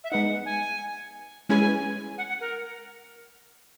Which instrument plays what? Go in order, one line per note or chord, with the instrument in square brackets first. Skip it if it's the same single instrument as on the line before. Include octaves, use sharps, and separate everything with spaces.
[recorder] E5
[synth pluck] G#3 B3 D#4 [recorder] F#5
[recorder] G#5
[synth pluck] G#3 C#4 E4 G#4 B4 [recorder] G#5
[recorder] F#5
F#5
A#4